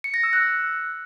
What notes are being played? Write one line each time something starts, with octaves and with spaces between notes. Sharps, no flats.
C#7
A#6
E6
F#6